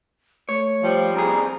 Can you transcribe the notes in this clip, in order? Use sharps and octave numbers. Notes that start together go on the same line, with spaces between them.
A3 C#5
F3 G3
F2 G#4 A#5